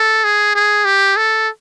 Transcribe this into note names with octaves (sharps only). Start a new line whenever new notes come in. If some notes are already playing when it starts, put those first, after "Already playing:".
Already playing: A4
G#4
G#4
G4
A4